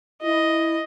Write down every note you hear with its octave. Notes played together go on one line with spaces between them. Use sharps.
E4 D#5